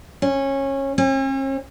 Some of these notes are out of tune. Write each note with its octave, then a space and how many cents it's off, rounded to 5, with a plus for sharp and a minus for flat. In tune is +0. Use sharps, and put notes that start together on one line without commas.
C#4 -20
C#4 -45